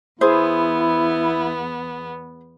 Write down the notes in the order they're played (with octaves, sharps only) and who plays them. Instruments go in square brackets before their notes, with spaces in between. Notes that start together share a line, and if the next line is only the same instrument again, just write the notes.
[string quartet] E2 B3 [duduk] E4 [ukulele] G#4 C5